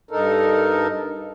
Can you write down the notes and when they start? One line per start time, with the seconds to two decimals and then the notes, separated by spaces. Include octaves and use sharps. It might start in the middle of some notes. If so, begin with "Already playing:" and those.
0.11 G2 D#4 A4 A#4